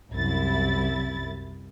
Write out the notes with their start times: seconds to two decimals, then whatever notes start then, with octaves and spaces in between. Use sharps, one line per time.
0.12 C2 F#2 E4 A6